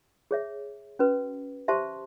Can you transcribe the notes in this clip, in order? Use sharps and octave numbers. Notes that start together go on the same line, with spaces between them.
G#4 C#5 E5
C#4 F#4 B4
G4 C5 E5 A5 C6